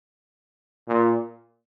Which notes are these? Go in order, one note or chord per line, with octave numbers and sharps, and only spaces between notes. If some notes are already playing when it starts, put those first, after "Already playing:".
A#2